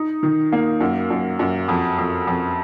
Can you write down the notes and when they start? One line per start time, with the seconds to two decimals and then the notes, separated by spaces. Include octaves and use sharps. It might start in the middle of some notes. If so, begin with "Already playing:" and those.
Already playing: D#4
0.23 D#3
0.52 A#3
0.80 F#2
1.10 F#2
1.39 F#2
1.68 F2
1.98 F2
2.27 F2